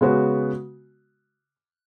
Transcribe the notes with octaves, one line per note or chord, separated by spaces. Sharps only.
C#3 G#3 B3 F#4 B4